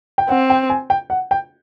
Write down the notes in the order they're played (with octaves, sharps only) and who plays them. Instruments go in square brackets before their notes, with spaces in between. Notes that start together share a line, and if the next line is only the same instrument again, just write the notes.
[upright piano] G5
[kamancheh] C4 [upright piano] F#5
[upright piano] G5
G#5
G5
F#5
G5